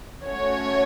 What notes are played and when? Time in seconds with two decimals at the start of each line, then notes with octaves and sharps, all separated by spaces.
0.25 A3 C#4 F#4 C#5